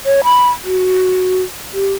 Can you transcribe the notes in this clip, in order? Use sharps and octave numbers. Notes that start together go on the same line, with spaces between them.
C#5
B5
F#4
G4